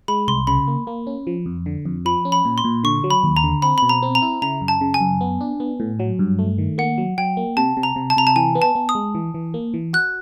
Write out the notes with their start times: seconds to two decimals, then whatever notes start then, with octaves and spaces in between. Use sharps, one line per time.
0.08 G#3 B5
0.28 C2 C6
0.47 C#3 B5
0.68 A#3
0.87 A#3
1.07 C#4
1.27 F3
1.46 F2
1.66 D3
1.85 F2
2.05 F3 B5
2.25 C#4
2.32 B5
2.45 A#2
2.58 C6
2.64 A#2
2.84 D3 C#6
3.04 F#3
3.11 B5
3.24 D#2
3.37 A#5
3.44 D3
3.62 C4 B5
3.78 B2 B5
3.89 A#5
4.03 C4
4.15 A#5
4.22 E4
4.42 C#3 A#5
4.61 F#2
4.68 A5
4.81 C#3
4.94 G#5
5.01 F#2
5.21 B3
5.41 D4
5.60 B3
5.80 A2
6.00 F#3
6.19 G2
6.39 A3
6.58 D#3
6.78 A#3 F#5
6.98 F#3
7.18 F#3 G5
7.37 A#3
7.57 C3 A5
7.77 C3
7.83 A#5
7.96 C3
8.10 A5
8.17 C3 A#5
8.27 A5
8.36 E3 G#5
8.55 B3
8.62 A5
8.75 B3
8.89 D#6
8.95 G#3
9.15 E3
9.34 E3
9.54 A#3
9.74 E3
9.93 F#4 F#6